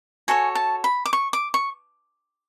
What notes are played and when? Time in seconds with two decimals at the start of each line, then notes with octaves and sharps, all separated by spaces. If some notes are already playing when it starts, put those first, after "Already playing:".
0.28 F#4 A4 C#5 G#5
0.55 A5
0.84 B5
1.06 D6
1.13 C#6
1.33 D6
1.54 C#6